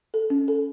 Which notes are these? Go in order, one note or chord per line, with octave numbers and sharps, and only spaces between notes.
A4
C#4
A4